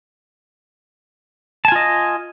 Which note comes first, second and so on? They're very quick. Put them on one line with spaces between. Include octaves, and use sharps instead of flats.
A5 G#5 F4 D#5